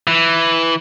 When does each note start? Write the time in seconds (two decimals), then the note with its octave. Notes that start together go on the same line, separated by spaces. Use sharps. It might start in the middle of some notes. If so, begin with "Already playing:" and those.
0.07 E3